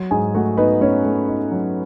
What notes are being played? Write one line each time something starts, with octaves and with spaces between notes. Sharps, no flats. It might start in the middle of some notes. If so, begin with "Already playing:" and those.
Already playing: F#3
G#2 G#4 G#5
A3 F#4 F#5
B3 D#4 B4
A3 C#4 C#5
A3
D#4
F#3